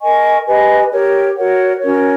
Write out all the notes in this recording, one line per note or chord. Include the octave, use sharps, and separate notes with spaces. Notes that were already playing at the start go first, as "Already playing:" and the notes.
A#4 D#5 G#5 C#6
G4 B4 D#5 G#5
G4 A#4 C#5
F#4 A#4 C#5 F#5
C#4 F#4 A#4 C#5